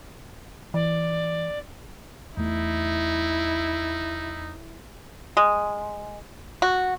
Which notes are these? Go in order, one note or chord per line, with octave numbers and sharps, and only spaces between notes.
E3 D5
E2 A3 D#4 E4
G#3
F#4